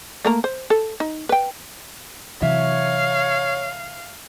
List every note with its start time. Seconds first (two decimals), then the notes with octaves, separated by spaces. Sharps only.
0.25 A3 A#3 A#5
0.44 C5
0.70 A4
1.00 D#4
1.29 B4 G5
2.42 C3 E3 F#3 C#5 E5 F5